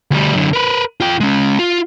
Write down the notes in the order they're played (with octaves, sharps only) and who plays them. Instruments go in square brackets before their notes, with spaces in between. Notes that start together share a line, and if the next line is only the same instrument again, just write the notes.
[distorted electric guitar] D2 G3
F#2 D3
A#4 B4
F4 G5
G#3 C#4
F4